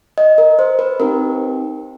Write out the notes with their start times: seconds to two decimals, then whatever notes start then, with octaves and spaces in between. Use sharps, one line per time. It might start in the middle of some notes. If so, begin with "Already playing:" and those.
0.18 D#5
0.38 A#4
0.59 C5
0.79 B4
1.00 C4 D#4 G4 A#4